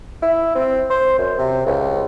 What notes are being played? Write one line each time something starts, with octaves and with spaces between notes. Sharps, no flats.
E4
C4
C5
F#2
C3
C#2